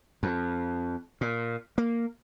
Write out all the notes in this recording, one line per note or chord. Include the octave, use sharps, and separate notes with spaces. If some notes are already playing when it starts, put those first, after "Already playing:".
F2
A#2
A#3